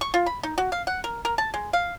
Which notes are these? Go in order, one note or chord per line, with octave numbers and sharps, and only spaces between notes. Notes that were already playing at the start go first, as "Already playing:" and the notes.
C#6
F4
B5
D#4
F#4
F5
F#5
A#4
A#4
A5
G#3
F5